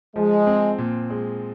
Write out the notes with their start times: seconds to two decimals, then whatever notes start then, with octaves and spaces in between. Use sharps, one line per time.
0.16 F3 G#3
0.47 C4
0.78 A#2
1.10 G#3